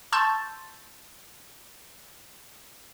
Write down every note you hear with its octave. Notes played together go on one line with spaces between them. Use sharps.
A5 C6 C#6 E6 G6 A6